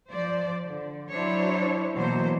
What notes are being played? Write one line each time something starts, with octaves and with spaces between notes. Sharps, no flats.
F3 C5 D5
D3
F#3 D4 E4 C5 C#5
B2 E3 F#3 A#3 C5